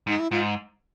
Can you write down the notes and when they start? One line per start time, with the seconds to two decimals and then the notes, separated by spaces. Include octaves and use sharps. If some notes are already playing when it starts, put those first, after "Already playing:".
0.07 G#2 D#4
0.19 E4
0.31 G#2 F4